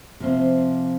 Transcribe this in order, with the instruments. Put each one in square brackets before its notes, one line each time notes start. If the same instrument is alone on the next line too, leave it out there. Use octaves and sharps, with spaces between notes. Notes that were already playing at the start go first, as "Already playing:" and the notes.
[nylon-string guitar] C3 F3 C4